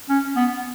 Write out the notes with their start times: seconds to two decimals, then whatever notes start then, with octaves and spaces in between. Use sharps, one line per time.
0.10 C#4
0.36 B3